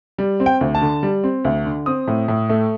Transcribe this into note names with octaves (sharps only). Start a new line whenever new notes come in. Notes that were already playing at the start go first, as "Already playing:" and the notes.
G3
C4
G5
D2
A5
D3
G3
C4
D2
D3
C4 D#6
A2
A2
A3